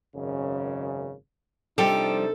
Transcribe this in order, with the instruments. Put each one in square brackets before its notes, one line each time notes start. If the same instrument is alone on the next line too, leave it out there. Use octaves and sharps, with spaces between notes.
[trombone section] G#1 F#2 C#3
[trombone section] C3 D4 D#4 [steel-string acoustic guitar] F3 G3 [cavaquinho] G4 [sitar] A4